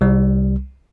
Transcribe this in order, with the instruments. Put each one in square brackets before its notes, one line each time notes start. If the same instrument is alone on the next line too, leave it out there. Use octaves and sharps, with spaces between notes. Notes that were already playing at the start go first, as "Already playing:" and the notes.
[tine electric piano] C2 G3